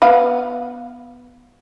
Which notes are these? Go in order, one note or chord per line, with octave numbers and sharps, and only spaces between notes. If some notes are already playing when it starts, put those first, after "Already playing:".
B3 B4 F5